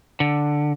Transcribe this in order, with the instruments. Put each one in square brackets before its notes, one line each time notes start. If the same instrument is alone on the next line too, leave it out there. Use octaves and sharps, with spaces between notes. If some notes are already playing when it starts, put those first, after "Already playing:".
[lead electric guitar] D3